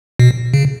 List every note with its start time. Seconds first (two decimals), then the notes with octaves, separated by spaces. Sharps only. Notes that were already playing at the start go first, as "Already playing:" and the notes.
0.19 B2
0.54 C#3